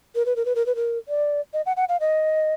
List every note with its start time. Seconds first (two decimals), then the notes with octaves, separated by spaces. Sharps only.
0.15 A#4
0.26 B4
0.36 A#4
0.45 B4
0.55 A#4
0.66 B4
0.75 A#4
1.08 D5
1.53 D#5
1.66 F#5
1.76 F#5
1.89 F5
2.00 D#5